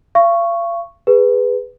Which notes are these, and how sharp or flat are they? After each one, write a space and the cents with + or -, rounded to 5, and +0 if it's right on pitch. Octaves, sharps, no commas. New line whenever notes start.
F5 -40 C#6 +0
G#4 -15 B4 +0